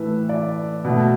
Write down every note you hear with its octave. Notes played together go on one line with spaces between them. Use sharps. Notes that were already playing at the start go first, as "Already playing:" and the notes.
Already playing: A2 E3 A3 B4 E5
D5
B2 A3